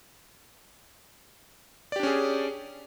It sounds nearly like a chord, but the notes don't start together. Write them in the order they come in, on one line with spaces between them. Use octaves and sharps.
D5 G4 D4 C#4 G#4